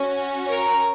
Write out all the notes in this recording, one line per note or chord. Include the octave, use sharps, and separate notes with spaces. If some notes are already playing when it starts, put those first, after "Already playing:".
Already playing: C#4 F#4
A#4 C#5